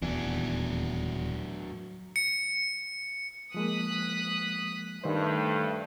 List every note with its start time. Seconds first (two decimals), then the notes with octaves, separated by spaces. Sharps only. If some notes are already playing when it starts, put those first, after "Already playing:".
0.02 D#1 E2 F#3 D4
2.16 C#7
3.54 F3 G#3 A#3 D#6 F#6 B6
5.04 G2 D#3 A3 C5